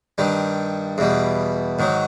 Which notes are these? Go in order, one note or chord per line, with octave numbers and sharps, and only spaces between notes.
G2 D#3 G3
E2 B2 G3
G#2 D#3 F#3